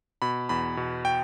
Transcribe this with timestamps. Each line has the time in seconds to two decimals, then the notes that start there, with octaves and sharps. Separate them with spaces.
0.22 B2 B5
0.49 E2 B5
0.77 B2
1.05 G5